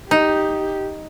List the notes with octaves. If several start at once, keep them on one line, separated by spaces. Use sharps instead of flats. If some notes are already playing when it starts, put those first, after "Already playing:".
D#4 G4